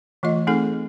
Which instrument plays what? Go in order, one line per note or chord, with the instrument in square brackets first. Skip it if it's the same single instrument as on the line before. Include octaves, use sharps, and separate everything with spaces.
[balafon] E3 A3 F4 D#5
A3 C4 D#4 G#4 A4